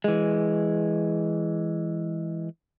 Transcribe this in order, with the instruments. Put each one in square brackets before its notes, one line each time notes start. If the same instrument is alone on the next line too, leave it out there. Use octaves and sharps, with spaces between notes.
[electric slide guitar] E3 G#3